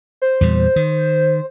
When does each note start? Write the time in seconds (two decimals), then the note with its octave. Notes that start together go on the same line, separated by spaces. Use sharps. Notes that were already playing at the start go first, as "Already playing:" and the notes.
0.22 C5
0.41 E2 A#2 G3
0.76 D#3